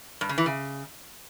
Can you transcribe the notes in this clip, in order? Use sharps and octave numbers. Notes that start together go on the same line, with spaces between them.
G2
C#3
E3
C#3